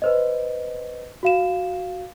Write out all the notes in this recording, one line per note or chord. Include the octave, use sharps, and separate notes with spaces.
B4 C5 D#5
F#4 F5 E7